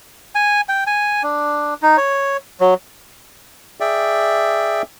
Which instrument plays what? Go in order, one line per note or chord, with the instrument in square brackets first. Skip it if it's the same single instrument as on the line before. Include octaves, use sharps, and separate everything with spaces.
[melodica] G#5
G5
G#5
D4
D#4
C#5
F#3
[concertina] G#4 D5 E5 G5